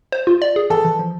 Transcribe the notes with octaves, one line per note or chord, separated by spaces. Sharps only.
C5
F4
D5
G#4
E3 A4
E3
F3